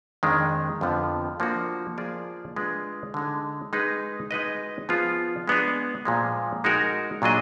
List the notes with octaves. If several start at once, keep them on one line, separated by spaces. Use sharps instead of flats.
F2 D#3 G#3 D4
F2 D3 F3 B3
F3 A#3 D4 F#4
F3 A#3 F4 G#4 D5
G#3 D4 F4 B4 D5
D3 G#3 D#4
G#3 D#4 G#4 B4
G#3 D#4 F#4 B4 D#5
F3 B3 F4 G#4
G#3 B3 D4 G#4
A#2 F3 G#3
G#3 D#4 F#4 A#4
A#2 F#3 D4 G#4 D#5